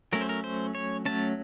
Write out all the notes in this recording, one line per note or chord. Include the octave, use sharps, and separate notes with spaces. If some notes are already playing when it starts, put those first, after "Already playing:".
F#3 A3 C#4 A#4
C5
A#4
C5
C#5
F#3 A3 C#4 A5